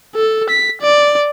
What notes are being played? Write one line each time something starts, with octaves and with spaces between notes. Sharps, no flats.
A4
B6
D5